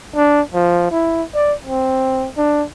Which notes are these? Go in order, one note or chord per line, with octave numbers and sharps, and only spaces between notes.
D4
F3
E4
D5
C4
D4